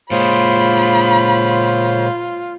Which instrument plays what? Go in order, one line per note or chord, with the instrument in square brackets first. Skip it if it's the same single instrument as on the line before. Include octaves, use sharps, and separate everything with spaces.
[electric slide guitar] A#2 G#3 [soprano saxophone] F4 [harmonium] C5 C#5 [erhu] B5